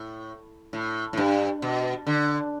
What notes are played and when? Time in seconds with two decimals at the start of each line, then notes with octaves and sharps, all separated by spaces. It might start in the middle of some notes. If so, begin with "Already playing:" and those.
Already playing: A2
0.73 A2
1.13 A2
1.17 G2
1.62 B2
2.07 D3